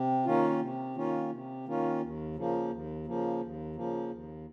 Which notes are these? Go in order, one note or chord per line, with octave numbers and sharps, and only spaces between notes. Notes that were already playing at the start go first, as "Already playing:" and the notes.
Already playing: C3
D#3 A#3 C#4 F4
C3
D#3 A#3 C#4 F4
C3
D#3 A#3 C#4 F4
D#2
C#3 F3 A#3
D#2
C#3 F3 A#3
D#2
C#3 F3 A#3
D#2